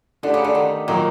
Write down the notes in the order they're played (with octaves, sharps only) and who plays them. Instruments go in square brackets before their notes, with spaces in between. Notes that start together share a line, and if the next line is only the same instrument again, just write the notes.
[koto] D3 [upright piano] A3 D4 G4
[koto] C#3
D3
D#3
[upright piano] A#2 F#3 A#3 [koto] D#3